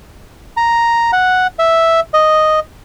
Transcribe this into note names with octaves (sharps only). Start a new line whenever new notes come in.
A#5
F#5
E5
D#5